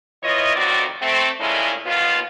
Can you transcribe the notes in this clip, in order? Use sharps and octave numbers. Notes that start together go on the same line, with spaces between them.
E3 E4 F4 C#5 D#5
F2 A2 D#3 C4 F#4 D5
A3 C4
A#2 D#3 G#3 A3 C#4 E4
D#2 B3 F4